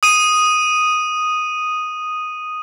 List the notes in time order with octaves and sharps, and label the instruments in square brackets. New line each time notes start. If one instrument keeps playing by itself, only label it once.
[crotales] D#6 D#7